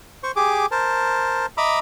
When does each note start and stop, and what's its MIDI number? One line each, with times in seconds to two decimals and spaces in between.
0.23 0.32 72
0.23 0.32 85
0.36 0.66 67
0.36 0.66 68
0.36 0.66 86
0.71 1.46 70
0.71 1.46 72
0.71 1.46 81
1.57 1.79 75
1.57 1.79 76
1.57 1.79 82
1.57 1.79 83
1.57 1.79 86
1.57 1.79 88